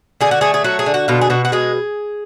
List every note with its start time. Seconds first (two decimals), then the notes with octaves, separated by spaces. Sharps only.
0.21 D3 G#4
0.31 F#4
0.41 A3 G#4
0.54 G#4
0.64 F#3 F#4
0.79 G#4
0.86 D3
0.94 F#4
1.08 B2 F4
1.21 G#4
1.30 B2 F#4
1.45 F#4
1.52 G#3 G#4